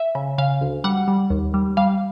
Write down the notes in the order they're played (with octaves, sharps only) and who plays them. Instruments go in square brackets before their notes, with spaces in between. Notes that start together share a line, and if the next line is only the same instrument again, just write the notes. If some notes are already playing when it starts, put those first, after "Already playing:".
Already playing: [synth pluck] E5
C#3
C#3 F5
D2
G3 F#5
G3
D#2
G3
G3 F5